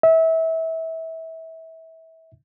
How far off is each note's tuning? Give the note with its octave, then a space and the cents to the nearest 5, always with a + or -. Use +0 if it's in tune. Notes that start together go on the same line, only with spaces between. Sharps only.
E5 -25